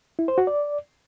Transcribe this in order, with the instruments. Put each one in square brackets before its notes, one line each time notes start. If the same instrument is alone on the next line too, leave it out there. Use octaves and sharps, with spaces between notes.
[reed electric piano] E4
C5
F#4
D5